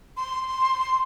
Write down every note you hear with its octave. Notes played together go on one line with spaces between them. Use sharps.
C6